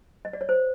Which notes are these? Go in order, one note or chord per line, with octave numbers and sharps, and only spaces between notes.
D#5
D5
C#5
C5